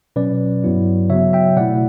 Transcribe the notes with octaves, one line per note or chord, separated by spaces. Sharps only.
B2 F#3 C#4 B4 D5
G2 F#3 B3 E4
C#3 F#3 B3 C#5 E5
E5 G5
B2 A3 E4 D5 F#5